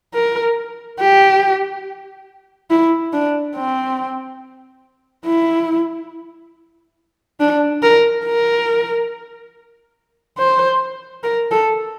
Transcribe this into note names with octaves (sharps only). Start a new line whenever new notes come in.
A#4
G4
E4
D4
C4
E4
D4
A#4
A#4
C5
A#4
A4